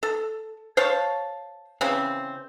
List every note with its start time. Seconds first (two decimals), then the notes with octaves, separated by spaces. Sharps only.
0.03 A4
0.77 C5 C#5 F5 A5
1.81 C#3 E3 C4